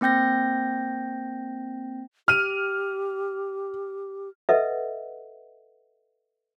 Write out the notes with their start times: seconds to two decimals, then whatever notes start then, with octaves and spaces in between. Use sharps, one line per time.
0.01 A#3 C4 G5 G6 A#6
2.28 G4 F6 D#7
4.49 A4 B4 D#5 E5 F#5